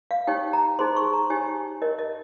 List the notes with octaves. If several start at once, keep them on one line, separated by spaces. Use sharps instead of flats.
F5
D#4 G4 C#5 G5
A#5
D#4 G#4 C5 C6
C#6
A#5
D#4 G4 C#5 G#5
D#4 A#4 C#5 D#5
D#5